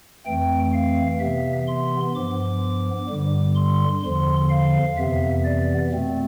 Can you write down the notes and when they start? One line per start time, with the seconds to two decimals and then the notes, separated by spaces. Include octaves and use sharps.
0.26 F2 E3 A3 C4 G5
0.74 F5
1.20 C3 E3 B3 E5
1.67 C6
2.14 G2 F3 B3 D6
3.09 G2 D3 G3
3.55 C6
4.03 E2 D3 F3 C6
4.50 F5
4.98 F2 C3 E3 B3 E5
5.45 D5
5.92 B2 A3 C4